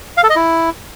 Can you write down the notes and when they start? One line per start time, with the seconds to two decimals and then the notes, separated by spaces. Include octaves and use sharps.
0.17 F5
0.24 A4
0.30 D#5
0.36 E4